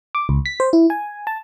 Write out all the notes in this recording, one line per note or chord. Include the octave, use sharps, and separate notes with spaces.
D6
C#2
B6
C5
E4
G#5
A5